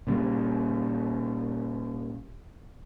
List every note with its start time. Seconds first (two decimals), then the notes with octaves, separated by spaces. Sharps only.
0.07 A#2 C#3 G3